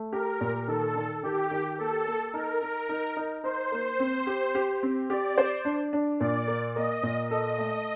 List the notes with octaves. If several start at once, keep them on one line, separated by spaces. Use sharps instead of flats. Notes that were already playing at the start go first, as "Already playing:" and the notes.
Already playing: A3
G4 A#4
A#2
D#3 A4
D#3
D#3 G4
D#3
A#3 A4
A#3
D#4 A#4
D#4
D#4
D#4
D#4 C5
A#3
C4
G4
G4
C4
G4 D5
C5
D4
D4
A#2 D5
A#3
A#3 D#5
A#2
A4 D#5
A3